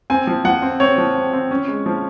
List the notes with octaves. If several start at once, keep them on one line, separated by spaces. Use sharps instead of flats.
C4 G#5
F3
F3 F#5
C4
C4 C#5
F3
C4
C4
C#4
G#3
F3